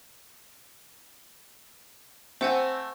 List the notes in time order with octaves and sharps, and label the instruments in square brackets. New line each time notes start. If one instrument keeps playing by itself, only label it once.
[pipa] A3 [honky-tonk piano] C4 [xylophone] C5 F#5 G#5